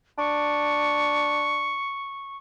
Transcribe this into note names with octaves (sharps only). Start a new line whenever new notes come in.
D4 C#6